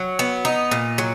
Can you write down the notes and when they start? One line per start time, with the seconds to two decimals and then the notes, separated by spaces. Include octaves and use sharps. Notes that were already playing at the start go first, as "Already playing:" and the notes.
Already playing: F#3
0.19 B3
0.45 D#4
0.71 A#2
0.98 F#3